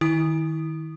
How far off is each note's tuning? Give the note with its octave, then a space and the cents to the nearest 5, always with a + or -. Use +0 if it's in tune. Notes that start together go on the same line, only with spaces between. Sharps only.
D#3 +0 E4 -20 D#6 -15